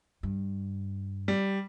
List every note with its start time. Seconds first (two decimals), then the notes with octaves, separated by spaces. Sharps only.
0.23 G2
1.28 G3